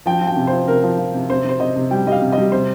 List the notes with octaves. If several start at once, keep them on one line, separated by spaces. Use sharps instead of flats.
F3 G5
F3
G5
C3
C5
F3
C3 A#4
F3
F3
C3
C3 C5
C3 C5
C3 D#5
C3
G3 G5
G3 D#5
F5
C3
D#5
G3
C3 C5